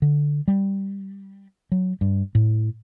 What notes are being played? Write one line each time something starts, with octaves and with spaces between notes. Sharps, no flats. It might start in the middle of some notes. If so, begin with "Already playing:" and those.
D3
G3
F#3
G2
A2